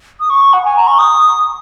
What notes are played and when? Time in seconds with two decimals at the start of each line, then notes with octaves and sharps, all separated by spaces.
0.20 D#6
0.30 C#6
0.53 F#5
0.65 G#5
0.77 A#5
0.87 C#6
0.99 D#6